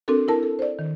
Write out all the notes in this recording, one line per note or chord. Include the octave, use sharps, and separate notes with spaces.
C4 D4 F#4 A4 A#4
E4 A#4 A5
A4
C5 D5
D#3